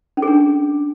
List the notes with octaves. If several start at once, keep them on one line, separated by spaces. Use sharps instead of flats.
C#4
G#4
D4